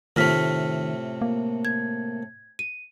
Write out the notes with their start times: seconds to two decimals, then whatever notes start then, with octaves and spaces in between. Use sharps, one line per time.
0.16 A2 C3 D#3 A3 F4 F6 B6
1.22 A#3
1.65 G#6
2.59 D#7